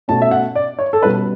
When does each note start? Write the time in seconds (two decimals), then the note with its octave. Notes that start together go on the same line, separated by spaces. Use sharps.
0.08 B2 A3 C#4 A5
0.22 E5
0.31 F#5
0.55 D5
0.79 C#5
0.93 A4
1.03 B2 G3 C#4 B4